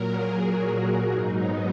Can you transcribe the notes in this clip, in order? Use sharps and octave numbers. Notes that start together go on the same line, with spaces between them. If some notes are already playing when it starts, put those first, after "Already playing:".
Already playing: A#2 F#3 A#4
G#4
F#4
G#2 F#3 D#4
B3